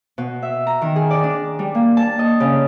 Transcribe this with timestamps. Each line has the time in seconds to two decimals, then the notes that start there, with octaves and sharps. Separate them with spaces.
0.18 B2
0.43 E5
0.67 A#5
0.82 D#3
0.96 G#4
1.11 D5
1.24 D4
1.59 G3
1.75 A#3
1.97 A5
2.19 D#5
2.40 C#3